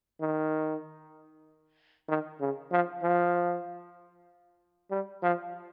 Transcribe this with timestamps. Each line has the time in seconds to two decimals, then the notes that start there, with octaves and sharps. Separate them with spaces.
0.21 D#3
2.09 D#3
2.40 C#3
2.71 F3
3.03 F3
4.90 G3
5.23 F3